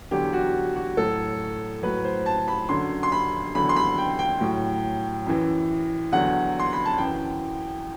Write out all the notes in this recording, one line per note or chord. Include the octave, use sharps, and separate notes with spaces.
E2 D3 F#3 G4
F#4
F#4
A2 F#3 A4
A2 F#3 B4
C5
A5
B5
F#2 D3 F#3 C6
C6
B5
E2 D3 F#3 B5
C6
B5
G5
G5
A2 F#3
F#2 E3
E2 D3 F#3 F#5
C6
B5
A5
F#2 E3 G5